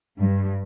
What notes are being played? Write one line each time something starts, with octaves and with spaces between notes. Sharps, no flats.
G2